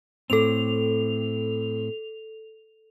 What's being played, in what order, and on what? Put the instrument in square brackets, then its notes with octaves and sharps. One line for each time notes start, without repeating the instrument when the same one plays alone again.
[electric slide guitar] A2 C4 [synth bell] A4 F7